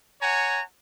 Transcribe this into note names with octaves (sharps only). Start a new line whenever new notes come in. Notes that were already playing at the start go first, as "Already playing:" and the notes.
C#5 F#5 G#5 A#5